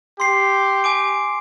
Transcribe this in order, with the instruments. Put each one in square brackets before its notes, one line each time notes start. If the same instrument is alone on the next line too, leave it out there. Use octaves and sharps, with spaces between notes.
[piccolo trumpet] G4 [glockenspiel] C6 C7
[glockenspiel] G#5 D6 D7